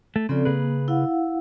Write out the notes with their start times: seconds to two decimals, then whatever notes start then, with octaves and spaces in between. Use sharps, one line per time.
0.16 A3
0.29 C#3 F3 C4 A4 D5
0.45 C#3 A#3 G#4 B4
0.88 E4 F5 F#5